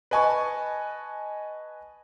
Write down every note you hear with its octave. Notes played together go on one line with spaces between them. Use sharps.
B4 D#5 G#5 A5 C#6